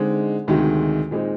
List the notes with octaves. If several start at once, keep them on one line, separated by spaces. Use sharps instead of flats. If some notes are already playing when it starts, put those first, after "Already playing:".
Already playing: D3 G#3 C4 D#4
D2 C3 D#3 G#3 D#4
A#2 G#3 C4 D#4